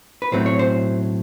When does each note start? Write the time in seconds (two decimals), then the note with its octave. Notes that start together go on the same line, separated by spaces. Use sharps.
0.22 B4
0.32 B1 A2 F#3 A3 C4 C5
0.46 C#5
0.59 C5